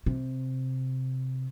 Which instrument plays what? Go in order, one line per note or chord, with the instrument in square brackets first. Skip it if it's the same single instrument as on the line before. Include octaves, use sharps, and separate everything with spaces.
[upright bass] C3